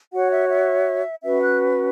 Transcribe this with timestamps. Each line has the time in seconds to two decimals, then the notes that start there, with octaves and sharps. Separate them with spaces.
0.12 F#4 C#5 F#5
0.31 E5
0.49 E5
1.23 C#4 F#4 B4 E5
1.41 F#6